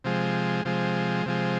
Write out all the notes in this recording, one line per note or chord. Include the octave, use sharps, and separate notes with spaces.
C3 F3 G#3
C3 F3 G#3
C3 F3 G#3